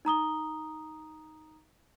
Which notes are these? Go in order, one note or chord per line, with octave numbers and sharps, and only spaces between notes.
D#4 A#5 D#6 G7